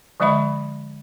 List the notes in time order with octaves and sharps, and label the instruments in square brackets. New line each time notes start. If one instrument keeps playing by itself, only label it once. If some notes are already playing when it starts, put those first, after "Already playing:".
[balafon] D3 F3 G#3 D#5 E5 B5